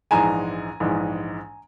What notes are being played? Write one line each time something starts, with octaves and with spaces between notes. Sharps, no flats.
A#1 G#2 E3 G#3 G#5 A#5
A#1 G#2 E3 G#3